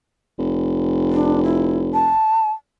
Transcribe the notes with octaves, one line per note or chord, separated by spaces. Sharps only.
F1
D4
E4
A5